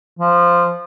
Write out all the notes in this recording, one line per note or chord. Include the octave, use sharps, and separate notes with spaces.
F3